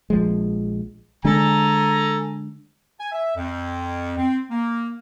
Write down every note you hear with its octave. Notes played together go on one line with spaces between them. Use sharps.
A#1 F3 G#3
D3 G#3 D4 A4 G#5 A#5
G#5
E5
F2
C4
A#3